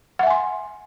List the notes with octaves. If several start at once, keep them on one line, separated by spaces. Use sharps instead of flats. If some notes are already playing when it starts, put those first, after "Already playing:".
E5 F#5 G#5 C6